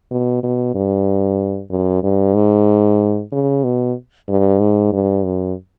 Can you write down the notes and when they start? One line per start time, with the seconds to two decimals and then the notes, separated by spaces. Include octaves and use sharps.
0.11 B2
0.43 B2
0.74 G2
1.70 F#2
2.03 G2
2.35 G#2
3.32 C#3
3.64 B2
4.28 G2
4.60 G#2
4.93 G2
5.25 F#2